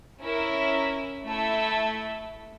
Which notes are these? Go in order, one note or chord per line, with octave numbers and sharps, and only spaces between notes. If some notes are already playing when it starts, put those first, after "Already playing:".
C#4 E4 A#4 E5
A3 E4 A4 E5